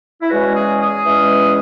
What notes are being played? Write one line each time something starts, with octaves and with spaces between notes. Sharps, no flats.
E4
E2 E3 G#3 C#4 F#4
G#4
G#4
E2 E3 G#3 C#4